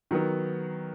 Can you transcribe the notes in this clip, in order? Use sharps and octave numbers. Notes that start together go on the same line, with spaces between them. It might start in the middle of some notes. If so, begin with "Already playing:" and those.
D#3 F#3 B3